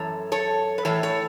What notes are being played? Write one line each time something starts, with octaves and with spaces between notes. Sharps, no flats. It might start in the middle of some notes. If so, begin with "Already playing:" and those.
Already playing: F#2 E3 A4 C#5
A4 C#5
B4
A2 E3 A4 C#5
A4 C#5